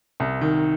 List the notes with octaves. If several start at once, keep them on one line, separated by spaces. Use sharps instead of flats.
C2
D#3